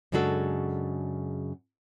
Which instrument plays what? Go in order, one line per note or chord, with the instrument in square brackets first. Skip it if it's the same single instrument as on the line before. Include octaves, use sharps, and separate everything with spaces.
[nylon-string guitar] F#2 C#3 G#3 D4 F#4 A4